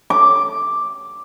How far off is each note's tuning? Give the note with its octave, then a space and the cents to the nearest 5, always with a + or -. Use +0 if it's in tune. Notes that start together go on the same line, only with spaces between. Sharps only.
D6 +0